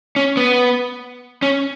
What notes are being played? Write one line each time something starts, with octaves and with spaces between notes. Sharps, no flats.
C#4
B3
C#4